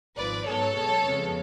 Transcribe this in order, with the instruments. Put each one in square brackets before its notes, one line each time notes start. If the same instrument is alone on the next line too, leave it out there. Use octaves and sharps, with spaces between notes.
[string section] G#1 G#2 F3 B4 D5
G#2 F#3 B3 A4 C#5
B1 B2 G#3 B3
F2 C#3 G#3 B3